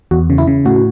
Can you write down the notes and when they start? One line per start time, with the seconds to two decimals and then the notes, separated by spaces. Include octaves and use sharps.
0.11 E2 F#4
0.30 C#3
0.38 E4
0.47 C#3
0.65 A2 F#4